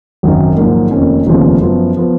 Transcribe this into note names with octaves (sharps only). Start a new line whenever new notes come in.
G#1 F#2 D#3
A#1 G#2 D#3 F#3 A#3
F1 F2 D#3 A#3 C#4
F1 D#2 C#3 F3 B3
F#2 F3 B3
F3 B3